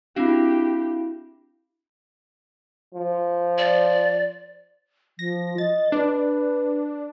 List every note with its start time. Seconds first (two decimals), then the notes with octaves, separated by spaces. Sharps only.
0.16 C4 D4 E4 F#4 G4 F5
2.95 F3
3.58 D5
5.19 F3 A#6
5.58 D#5 A6
5.92 D4 B4